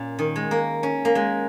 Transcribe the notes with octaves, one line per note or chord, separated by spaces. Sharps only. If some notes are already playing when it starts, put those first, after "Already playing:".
Already playing: A#2 C#4
D#3
G#3
A#3
C#4
A#3
G#3